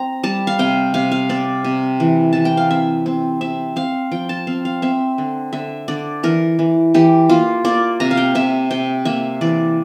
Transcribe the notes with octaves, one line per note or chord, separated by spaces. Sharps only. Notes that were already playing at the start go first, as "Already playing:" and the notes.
Already playing: C4 A#5
G3 A5
F5
C3 G5
C3 F5
F5
C4 D5
C3
E3
E3 A5
G5
F5
C4 E5
C4
C4 E5
C4 F5
F3 G5
A5
C4 F5
F5
C4 E5
D3
D3 E5
D3 D5
E3 A#4
E3
E3 G4
A#3 F4
A#3 D5
C3 A#5
F5
G5
C3 E5
C3 G5
A#3 E5
E3 D5